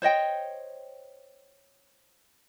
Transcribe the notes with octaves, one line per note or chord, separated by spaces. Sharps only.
C5 C#5 D#5 G5